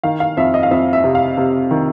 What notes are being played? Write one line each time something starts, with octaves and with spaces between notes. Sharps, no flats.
D#3 F5
F5
F2 E5
D#5
F5
F2 E5
E5
C3
F5
C3
D#3